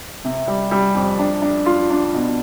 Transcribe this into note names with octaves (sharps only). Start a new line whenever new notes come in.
C3
G3
G3
F2
D4
D4
F4
D4
B2